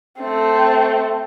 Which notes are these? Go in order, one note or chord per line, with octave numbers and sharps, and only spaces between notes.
A3 C4